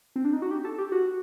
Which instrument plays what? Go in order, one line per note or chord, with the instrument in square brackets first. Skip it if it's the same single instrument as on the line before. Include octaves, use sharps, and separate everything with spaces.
[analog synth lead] C4
D4
D#4
F#4
G4
A4
G4
F#4